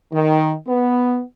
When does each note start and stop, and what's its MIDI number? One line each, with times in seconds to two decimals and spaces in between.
0.13 0.54 51
0.67 1.21 59